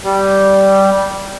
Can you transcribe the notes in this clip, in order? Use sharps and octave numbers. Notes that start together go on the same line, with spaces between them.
G3